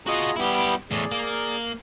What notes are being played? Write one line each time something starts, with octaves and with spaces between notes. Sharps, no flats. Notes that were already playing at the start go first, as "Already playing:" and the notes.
F4 F#4 G#4 D#5 A#5
G3 B3 E4 G4
E2 A2 G#4 D5
A#3